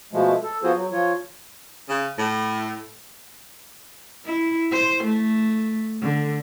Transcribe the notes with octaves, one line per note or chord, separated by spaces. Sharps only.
B2 F3 G#3 A3
A4
F3 B3 F4 F#4 G#4 C5
F#3
F3 F4 C#5
C#3
A2
E4
C5
A3
D3